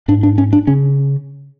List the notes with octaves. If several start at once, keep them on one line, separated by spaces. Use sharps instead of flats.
G#2 D4
D4
C#4
D4
C#3 C#4